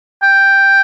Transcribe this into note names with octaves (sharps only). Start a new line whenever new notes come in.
G5